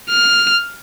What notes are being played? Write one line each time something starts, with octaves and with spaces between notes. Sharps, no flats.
F6